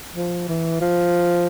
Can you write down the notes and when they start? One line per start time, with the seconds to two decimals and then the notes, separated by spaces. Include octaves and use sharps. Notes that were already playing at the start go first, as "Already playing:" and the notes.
0.16 F3
0.48 E3
0.81 F3